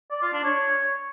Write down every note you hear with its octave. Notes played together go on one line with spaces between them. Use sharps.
D5
F4
D4
C#5